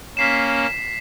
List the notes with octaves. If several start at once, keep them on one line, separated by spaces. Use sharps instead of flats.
A#3 C#4 B6 C7 E7